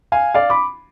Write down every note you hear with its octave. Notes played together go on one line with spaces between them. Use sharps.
F5 G#5
D5 F5
B5 D6